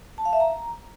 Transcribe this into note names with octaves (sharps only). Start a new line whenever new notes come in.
A5
F5
E5
A#5